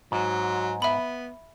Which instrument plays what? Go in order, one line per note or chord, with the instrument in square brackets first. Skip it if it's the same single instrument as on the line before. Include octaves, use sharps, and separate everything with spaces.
[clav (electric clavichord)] G#2 [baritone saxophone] F#3
[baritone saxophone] B3 [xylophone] E5 B5